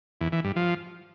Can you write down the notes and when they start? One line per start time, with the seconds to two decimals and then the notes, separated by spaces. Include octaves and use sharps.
0.21 E2
0.32 E3
0.44 G2
0.56 F3